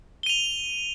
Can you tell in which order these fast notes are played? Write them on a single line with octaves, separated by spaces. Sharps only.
G7 D#7 F7